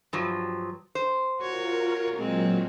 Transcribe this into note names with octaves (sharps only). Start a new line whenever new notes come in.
G2 F3 F#3
C5
F4 F#4 A#4 C#5
A#2 F#3 G#3 C4